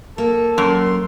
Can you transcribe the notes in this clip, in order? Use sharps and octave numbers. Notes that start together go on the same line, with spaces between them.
A#3 A4
F#2 C6